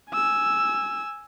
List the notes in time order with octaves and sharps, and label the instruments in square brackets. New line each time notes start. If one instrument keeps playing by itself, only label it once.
[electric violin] G#5 E6